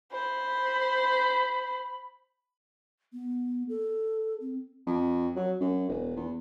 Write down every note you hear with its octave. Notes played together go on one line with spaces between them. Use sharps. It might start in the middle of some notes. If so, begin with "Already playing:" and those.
C5 B5
B3
A4
C4
F2
F#3
F#2
E1
E2